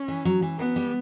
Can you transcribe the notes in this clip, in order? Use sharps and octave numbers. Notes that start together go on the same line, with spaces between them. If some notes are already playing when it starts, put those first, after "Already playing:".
Already playing: C#4
E3
F#3
E3
F#3 B3
G3